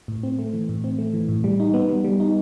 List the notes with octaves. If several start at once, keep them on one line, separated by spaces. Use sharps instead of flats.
A2
C4
A3
E3
A2
C4
A3
E3
A2
G3
D#4
B3
G3
G3
D#4